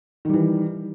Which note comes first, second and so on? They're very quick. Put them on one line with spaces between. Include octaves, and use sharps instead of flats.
D#3 G3 E3